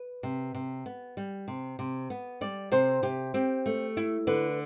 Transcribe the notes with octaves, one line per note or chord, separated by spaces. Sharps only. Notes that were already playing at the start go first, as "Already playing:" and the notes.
Already playing: B4
C3
C3
B3
G3
C3
C3
B3
G3 D5
C3 C5
C3 G4
C4 G4
A3
E4
D3 B4